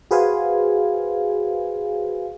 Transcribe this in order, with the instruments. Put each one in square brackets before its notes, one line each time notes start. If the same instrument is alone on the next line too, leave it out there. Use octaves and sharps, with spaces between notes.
[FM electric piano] F#4 G#4 B4 C5 F5 G#5